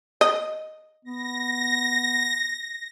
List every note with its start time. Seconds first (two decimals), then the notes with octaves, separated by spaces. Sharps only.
0.21 D#5
1.05 B3 A#6